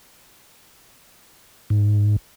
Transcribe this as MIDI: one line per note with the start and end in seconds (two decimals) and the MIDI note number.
1.70 2.16 44